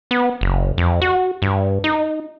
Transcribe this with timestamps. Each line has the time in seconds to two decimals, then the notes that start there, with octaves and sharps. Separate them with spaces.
0.11 B3
0.41 F#1
0.78 F2
1.02 F#4
1.42 G2
1.84 D#4